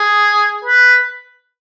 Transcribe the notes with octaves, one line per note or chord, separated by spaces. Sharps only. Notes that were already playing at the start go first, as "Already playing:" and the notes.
Already playing: G#4
B4